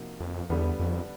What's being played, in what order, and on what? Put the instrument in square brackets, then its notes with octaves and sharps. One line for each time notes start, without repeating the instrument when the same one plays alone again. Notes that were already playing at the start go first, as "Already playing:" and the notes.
Already playing: [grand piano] C3 F3 A#3 D#4 F#4
[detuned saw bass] F2
[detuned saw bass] E2 [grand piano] D3 G3 B3
[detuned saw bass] F2